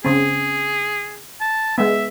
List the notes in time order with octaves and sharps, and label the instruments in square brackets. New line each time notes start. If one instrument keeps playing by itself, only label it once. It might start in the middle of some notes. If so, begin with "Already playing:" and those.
[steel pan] C#3 C4 [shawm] G#4
[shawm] A5
[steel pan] G#3 B3 [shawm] E5